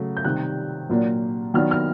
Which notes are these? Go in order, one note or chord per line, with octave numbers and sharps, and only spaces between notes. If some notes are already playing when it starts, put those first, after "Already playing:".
Already playing: C#3 F#3 A3
G6
C3 D#3 G3 F#6
A#2 F#3 A#3 D4
D#3 F#3 B3 D4 F6
F6